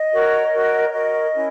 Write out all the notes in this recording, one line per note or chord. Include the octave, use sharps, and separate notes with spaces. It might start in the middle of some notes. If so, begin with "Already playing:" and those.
Already playing: D#5
F#4 A#4 C#5
F#4 A#4 C#5
F#4 A#4 C#5 D#5
C#4 E4